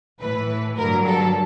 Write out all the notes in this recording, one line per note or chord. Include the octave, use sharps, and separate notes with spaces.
A2 E3 A3 B4
G2 D3 F#3 A#4
A4